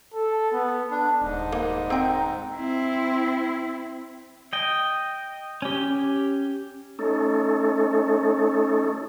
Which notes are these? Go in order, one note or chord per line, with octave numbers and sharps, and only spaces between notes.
A4
B3
D4
D#1 G#2
A#3 B4
C4 G#4 A#4 G5 A#5
C4 E4
D#5 G5
C#4 G4
A3 C#4 D#4 A4